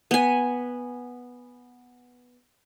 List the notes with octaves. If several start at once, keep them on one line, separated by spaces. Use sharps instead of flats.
B3 G#5